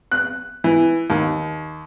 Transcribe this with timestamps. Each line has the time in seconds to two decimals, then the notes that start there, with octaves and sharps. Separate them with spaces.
0.12 F#6
0.64 E3
1.10 D#2